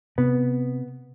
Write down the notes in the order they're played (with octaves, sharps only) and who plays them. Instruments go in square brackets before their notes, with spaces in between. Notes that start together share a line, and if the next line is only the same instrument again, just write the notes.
[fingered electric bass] C3 [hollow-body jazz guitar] B3